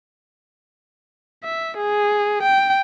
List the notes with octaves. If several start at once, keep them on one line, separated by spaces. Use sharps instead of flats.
E5
G#4
G5